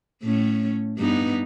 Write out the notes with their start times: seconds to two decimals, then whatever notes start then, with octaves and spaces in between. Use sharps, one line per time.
0.23 A2 A3 C#4
0.98 G2 B3 D#4